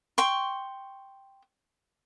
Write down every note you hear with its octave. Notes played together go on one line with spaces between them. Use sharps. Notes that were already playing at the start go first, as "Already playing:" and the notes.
G5 C6 C#6